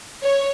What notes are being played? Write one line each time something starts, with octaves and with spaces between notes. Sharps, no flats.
C#5